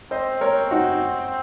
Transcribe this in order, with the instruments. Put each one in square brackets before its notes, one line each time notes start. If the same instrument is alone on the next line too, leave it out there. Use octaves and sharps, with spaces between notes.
[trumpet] C4 [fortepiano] C5 D#5
[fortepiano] A#4 C#5
D#4 F#4